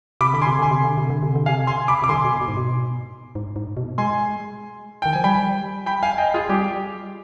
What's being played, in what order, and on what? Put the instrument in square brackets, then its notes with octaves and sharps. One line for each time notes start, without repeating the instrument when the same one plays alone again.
[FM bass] C3 [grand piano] B5 D6
[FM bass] D3 [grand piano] B5
[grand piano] G#5 C6
[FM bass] C3
[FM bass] D3 [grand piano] G#5 C6
[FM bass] C3
D3
C3
D3
C3
D3
[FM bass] C3 [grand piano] F5 G#5
[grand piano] G#5 C6
B5 D6
[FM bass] C3 [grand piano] D6
[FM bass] D3 [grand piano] G#5 C6
[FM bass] B2
B2
G#2
B2
G#2
G#2
B2
[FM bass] G#3 [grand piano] G#5 C6
[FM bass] D#3 [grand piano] G5
[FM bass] F3 [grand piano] G#5
[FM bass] G3 [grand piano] G5 B5
[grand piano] G5 B5
F5 G#5
D#5 G5
F4 G#4
[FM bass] G3 [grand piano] G4